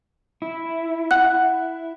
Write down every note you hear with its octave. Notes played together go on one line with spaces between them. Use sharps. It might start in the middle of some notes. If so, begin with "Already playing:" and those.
E4
F#5 F#6